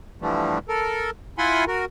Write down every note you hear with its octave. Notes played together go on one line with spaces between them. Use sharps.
D3 E3 F3 G3 A3
A4 A#4
E4 F4 F#5 G#5 B5 C6
F#4 A#4